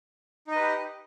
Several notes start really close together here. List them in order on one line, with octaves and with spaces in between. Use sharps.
D#4 D#5 B4 G4